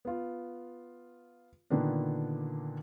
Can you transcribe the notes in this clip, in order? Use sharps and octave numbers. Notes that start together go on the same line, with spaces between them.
B3 F4
A#2 D3 D#3 B3 D4